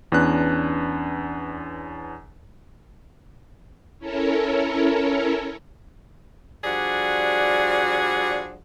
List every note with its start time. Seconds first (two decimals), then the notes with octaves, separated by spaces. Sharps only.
0.12 E2 C#4 D4 B4 F#6
3.99 C#4 E4 A4 A#4 C#5
6.64 F3 G3 D4 F#4 G#4